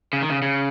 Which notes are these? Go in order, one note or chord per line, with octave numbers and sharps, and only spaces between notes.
C#3
D#3
C#3
C#3